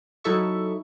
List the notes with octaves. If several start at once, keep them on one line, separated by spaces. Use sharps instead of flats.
F#3 D#4 E4 A4 E5 C#6